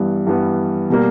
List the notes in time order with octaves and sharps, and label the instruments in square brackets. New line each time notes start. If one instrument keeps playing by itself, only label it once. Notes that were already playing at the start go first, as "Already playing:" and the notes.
Already playing: [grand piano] G2 E3 G3 B3
G2 E3 G3 B3
B2 G3 A#3